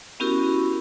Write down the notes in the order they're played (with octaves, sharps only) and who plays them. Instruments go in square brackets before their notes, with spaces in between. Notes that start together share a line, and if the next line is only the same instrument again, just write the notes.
[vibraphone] B3 C#4 E4 F#4 G4 A#4